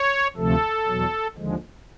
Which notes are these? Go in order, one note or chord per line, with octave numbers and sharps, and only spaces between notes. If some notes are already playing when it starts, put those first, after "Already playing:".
Already playing: C#5
D2 C3 F3 A3 A4
E2 B2 F#3
D#2 D3 F3 G#3